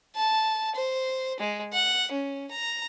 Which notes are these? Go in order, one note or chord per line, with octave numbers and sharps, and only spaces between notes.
A5
C5
G#3
F#5
C#4
A#5